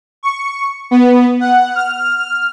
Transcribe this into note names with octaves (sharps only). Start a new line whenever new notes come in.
C#6
B3
F#5
F6
F6